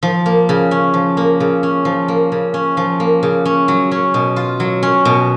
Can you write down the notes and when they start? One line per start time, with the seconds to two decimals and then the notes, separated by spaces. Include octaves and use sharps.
0.03 F3
0.26 A#3
0.49 C#3
0.71 C#4
0.94 F3
1.17 A#3
1.40 C#3
1.63 C#4
1.85 F3
2.08 A#3
2.32 C#3
2.54 C#4
2.77 F3
3.00 A#3
3.23 C#3
3.45 C#4
3.68 F#3
3.91 C#4
4.14 B2
4.36 F4
4.60 F#3
4.83 C#4
5.05 B2